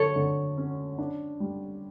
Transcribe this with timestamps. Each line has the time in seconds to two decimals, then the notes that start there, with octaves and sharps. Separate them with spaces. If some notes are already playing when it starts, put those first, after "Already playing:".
Already playing: D3 F#3 A4 C#5
0.16 D3
0.57 C#4
0.98 D4
1.40 G3